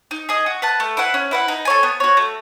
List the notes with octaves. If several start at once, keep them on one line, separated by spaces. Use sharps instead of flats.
D#4
G#4 D#5
F#4
B4 F#5 A5
A3
E4 B4 F#5
C#4
E4 B4 F#5
D#4
A4 C#5 G#5
B3
F#4 C#5
A3